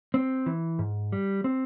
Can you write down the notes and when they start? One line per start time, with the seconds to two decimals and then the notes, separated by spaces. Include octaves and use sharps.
0.14 C4
0.46 E3
0.79 G#2
1.12 G3
1.44 C4